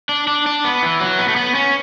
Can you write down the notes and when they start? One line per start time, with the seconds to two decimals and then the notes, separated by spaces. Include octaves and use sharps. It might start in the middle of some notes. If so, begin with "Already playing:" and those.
0.09 D4
0.27 D4
0.46 D4
0.65 B3
0.82 E3
1.00 F#3
1.19 B3
1.28 A3
1.36 B3
1.55 C#4